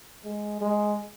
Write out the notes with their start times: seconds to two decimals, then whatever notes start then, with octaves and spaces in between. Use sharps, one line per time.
0.25 G#3
0.61 G#3